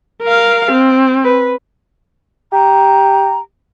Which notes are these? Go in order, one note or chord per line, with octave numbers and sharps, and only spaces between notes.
A#4 F5
C4
B4
G4 A#5